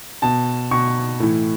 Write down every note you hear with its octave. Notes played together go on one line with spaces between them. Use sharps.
B2 A5
B2 C#6
A2 E3